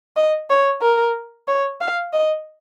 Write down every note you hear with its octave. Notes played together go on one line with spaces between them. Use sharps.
D#5
C#5
A#4
C#5
F5
D#5